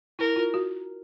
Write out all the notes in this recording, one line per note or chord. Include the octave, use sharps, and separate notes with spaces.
E4 A#4
F4
F#4